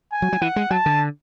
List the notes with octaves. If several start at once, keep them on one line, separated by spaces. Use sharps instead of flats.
G#5
F#3
F#3
E3 F#5
G#3
F#3 A5
D3